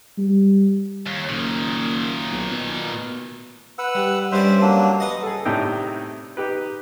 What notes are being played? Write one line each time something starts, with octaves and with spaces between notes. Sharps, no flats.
G3
D#2
F#1 A#2 D#3
B1
B2
B4 F#5 E6
G3
G2 C#4 C5 D5 E5
F#3 A#3 D4
B4 D#5 F#5
G#4 A4
A2 C3 D4 D#4 G5
D#4 G4 B4